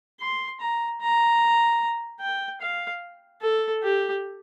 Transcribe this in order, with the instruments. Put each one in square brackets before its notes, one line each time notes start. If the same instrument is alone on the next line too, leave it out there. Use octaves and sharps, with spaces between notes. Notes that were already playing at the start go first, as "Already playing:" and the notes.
[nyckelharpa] C6
A#5
A#5
G5
F5
A4
G4